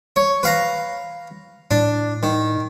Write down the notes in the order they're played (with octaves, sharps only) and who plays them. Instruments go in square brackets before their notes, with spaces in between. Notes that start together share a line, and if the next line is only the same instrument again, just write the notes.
[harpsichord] C#5
B4 F5 A#5
[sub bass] A2 [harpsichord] D4
[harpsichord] D#3